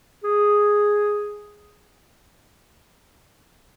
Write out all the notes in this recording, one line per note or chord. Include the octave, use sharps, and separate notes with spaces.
G#4